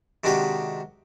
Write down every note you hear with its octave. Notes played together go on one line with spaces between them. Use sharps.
C3 D#3 G#3 D4 F#4 G4